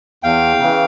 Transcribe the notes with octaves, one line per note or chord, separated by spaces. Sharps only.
E2 F5 G5
C#3 E3